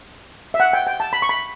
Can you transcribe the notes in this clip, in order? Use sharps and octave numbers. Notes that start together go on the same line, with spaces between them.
E5
F#5
G5
G5
A5
B5
C#6
B5